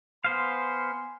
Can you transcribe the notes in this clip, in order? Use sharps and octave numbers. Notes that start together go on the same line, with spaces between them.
B3 C5 F5 G#5 C6